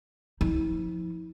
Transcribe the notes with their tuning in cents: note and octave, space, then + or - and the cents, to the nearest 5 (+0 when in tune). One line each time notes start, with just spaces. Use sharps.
F3 +0 E4 -45